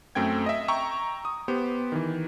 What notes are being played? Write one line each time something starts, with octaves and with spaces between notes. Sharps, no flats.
F#2 A3 C4 G5 G#6
D#5 E5
G5 A#5 C#6 E6
D#6
B3 G4 C5
D#3 E3